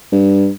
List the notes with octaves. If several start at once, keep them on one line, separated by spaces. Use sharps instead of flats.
G2